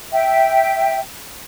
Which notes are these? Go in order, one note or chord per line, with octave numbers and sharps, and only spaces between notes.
E5 G5